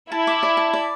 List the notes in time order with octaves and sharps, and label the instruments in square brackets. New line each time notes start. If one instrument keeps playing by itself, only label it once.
[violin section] E4 [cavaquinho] A5
[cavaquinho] D6
D5
A5
D5